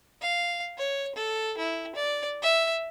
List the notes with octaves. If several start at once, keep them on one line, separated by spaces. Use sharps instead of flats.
F5
C#5
A4
E4
D5
E5